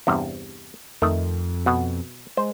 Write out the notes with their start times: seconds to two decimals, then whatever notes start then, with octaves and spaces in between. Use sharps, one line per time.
0.07 E2 G2 C3
1.02 F2 D#3 A3
1.66 B2 F#5
2.37 G#3 C5